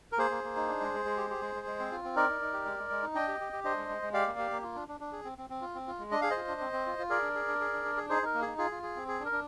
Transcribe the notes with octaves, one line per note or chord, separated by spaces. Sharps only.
A#4
A#3 G#4 C5
A#3
A#3
D#4
D4
G#3
G#3
G#3
G4
G4
G#3
G#3
G#3
C4
F4
C4
D#4 A#4 D5
D#4
D#4
G4
G#3
G#3
G#3
D#4
D4 D#5 G5
G4
G4
G4
D4 C5 D#5
G#3
G#3
G#3
G4 D5 F5
A#3
G4
A#3
F4
D4
D4
D4
G#4
C4
C4
C4
F4
C4
F4
G#3
D4 D#5
G#4 F5
C5 D#5
F4
D4
C4
C4
F4
F4
G#4 A#4 D5
D4
G#4
D4
G#4
D4
D4
G#4
D#4 G#4 C5
D#4 A#4
A#3
G#4
D#4
F4 G#4
F4
G#4
C4
G#4
D4
A#4
D4